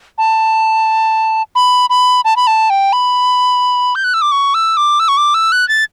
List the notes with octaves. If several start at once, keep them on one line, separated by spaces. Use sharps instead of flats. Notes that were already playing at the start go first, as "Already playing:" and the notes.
A5
B5
B5
A5
B5
A5
G5
B5
G6
F#6
E6
D6
C#6
E6
D6
E6
C#6
D6
E6
F#6
A6